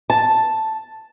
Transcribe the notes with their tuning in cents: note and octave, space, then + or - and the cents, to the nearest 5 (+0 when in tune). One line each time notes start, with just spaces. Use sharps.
A5 +0